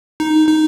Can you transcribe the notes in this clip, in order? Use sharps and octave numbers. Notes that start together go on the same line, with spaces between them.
D#4
D#4